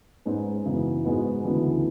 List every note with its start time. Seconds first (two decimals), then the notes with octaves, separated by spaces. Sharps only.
0.25 G#2 G#3 C#4 G#4 B4
0.65 F#2 C#3 E3 B3
1.04 G#2 G#3 B3 F#4 B4
1.43 D2 C#3 E3 B3 D4